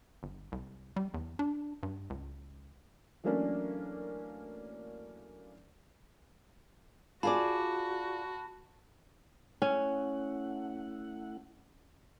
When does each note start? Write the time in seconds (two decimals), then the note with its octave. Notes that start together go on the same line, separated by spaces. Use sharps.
0.23 G1
0.52 C2
0.96 G3
1.14 E2
1.39 D4
1.83 G2
2.10 C#2
3.24 E3 F#3 A3 A#3 C#4 D4
7.23 F4 F#4 G#4 D5 A5 B5
9.62 A3 C#4 E4 F#5